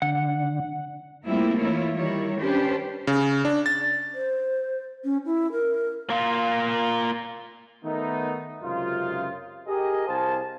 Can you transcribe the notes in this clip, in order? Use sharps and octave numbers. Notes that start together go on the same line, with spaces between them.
D3 F#5
G3 A3 A#3 C4 E4 F4
E3 E4 F4 C#5
D#3 G3 E4 C#5
C#4 D4 G4 B4 C5
C#3
D4
A6
C5
C#4
E4
A#4
A#3 F4
D#3 A3 B3 D#4
C#2 F#2 C3 D#4 F4
G4 G#4 A#4 D#5
C2 G4 C5 F5 G#5 A5